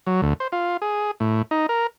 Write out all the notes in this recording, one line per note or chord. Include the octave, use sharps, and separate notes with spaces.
F#3
D2
C5
F4
G#4
A2
D#4
A#4